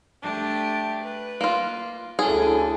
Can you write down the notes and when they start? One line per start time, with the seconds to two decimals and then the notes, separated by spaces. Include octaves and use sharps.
0.23 A3 D4 G4
1.02 B4
1.41 A#3 F4
2.19 D2 C#4 D4 E4 G#4 A4 G#5